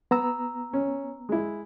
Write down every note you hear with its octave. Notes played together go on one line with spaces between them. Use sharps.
B3 A#5 E6
C#4
G#3 E4